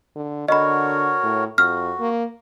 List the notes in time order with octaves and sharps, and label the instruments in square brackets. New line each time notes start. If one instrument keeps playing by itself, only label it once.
[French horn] D3
[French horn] D3 [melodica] F#4 A#4 C#5 [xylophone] D#5 B5
[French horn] A2
[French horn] F2 [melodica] F#4 [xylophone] F6
[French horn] A#3